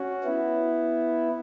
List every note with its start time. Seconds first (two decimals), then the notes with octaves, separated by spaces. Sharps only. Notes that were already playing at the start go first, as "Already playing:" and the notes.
Already playing: C#4 F#4
0.24 B3 E4